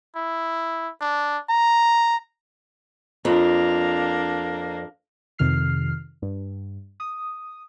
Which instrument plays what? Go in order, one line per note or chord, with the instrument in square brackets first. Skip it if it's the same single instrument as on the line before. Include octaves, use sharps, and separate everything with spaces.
[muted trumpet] E4
D4
A#5
[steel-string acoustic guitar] F2 [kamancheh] A#3 D4
[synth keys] F2 C3 D#3 F6 C7
G2
D#6